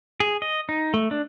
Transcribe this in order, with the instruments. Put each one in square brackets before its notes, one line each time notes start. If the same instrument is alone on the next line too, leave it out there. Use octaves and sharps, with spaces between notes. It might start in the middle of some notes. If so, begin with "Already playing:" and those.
[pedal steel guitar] G#4
D#5
D#4
A3
D4